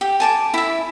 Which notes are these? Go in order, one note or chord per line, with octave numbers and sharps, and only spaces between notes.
G4
G#5 A5 D6
E4 E5